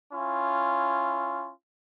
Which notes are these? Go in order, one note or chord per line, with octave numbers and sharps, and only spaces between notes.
C#4 E4 F4